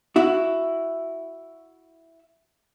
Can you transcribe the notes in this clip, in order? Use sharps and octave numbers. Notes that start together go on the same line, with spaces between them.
E4 F#4